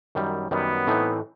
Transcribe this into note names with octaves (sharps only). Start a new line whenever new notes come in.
F#2 D#3 G3
F#2 D#3 G3 B3
A2 E3 A3 C4 D#4